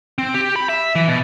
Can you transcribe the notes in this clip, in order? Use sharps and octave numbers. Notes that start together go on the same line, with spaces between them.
C4
G4
B5
E5
E3
B2